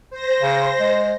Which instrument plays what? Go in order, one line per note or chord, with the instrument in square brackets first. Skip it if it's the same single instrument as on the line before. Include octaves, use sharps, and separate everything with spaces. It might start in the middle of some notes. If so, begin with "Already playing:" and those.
[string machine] C5 A#6
[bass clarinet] C#3
G#3